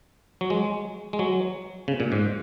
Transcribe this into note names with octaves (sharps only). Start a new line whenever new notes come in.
F#3
G#3
G#3
F#3
C#3
A#2
G#2